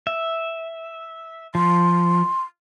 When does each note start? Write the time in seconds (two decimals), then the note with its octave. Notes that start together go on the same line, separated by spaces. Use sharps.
0.07 E5
1.55 F3 C6